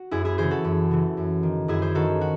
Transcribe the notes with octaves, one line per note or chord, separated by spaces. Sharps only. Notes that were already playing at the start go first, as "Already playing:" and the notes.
Already playing: F#4
F#2 E4 G#4
E4 G#4
C#3 E3 G#4 C5
F#4 A4
F#2
C#3 E3
F#2
D#3
F#2 E4 G#4
G#4 C5
D#3 F#4 A4
F#4